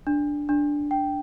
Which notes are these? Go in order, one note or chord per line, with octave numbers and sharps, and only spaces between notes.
D4
D4
G5